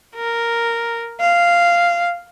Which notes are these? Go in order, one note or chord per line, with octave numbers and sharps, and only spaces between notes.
A#4
F5